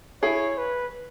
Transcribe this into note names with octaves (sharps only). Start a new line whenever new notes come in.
E4 G#4 C#5
B4